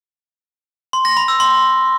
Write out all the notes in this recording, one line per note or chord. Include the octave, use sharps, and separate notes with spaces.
C6
A#6
B5
E6
C6